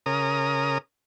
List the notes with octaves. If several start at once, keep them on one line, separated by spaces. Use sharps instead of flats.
C#3 A#4 D#6